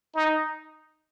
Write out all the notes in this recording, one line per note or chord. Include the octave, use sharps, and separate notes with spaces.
D#4